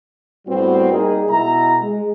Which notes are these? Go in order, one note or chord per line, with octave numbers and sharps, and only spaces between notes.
A2 G3 B3 C4 F#4 B4
G3 A#3 D#4 G#4
B2 G#3 E4 A#5
G#3